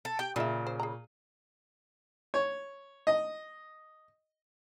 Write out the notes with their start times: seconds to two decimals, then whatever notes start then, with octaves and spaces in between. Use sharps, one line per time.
0.05 A4
0.19 G4 G5
0.36 A#2 C#3 G#3 E5
0.67 C5
0.80 G#4 A#5
2.34 C#5
3.07 D#5